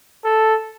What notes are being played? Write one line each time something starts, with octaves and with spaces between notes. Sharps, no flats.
A4